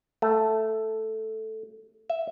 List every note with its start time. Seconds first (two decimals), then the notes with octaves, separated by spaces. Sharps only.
0.22 A3
2.10 E5